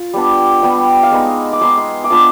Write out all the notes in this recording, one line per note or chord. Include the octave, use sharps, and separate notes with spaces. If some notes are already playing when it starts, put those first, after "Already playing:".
Already playing: F4
G3 B3 D4
G3 B3 D4 G5
F5
G#3 B3 D#4 D#5
D6
G#3 B3 D#4 C6
C6
D6
B3 D4 F4 D#6